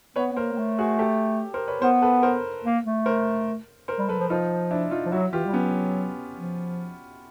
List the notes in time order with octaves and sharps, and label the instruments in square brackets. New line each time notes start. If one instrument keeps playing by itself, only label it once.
[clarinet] B3 [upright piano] B4 C#5
[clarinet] B3
[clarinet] A#3 [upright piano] A#4 C5
[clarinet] A#3
A3
[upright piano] F#4 G#4
G4 A4
A#4 C5
B4 C#5
[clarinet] B3 [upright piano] A#4 C5
[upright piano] A4 B4
A#4 C5
[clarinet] A#3
A3
[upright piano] A#4 C5
A#4 C5
[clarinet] G3
[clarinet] F#3 [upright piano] A4 B4
[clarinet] F3
[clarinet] F3 [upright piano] D#4 F4
[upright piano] D4 E4
D#4 F4
[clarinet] F3
[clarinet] F#3 [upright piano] E4 F#4
[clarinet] E3 [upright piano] F4 G4
[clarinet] G3
[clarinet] F#3 [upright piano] B3 C#4
[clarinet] F3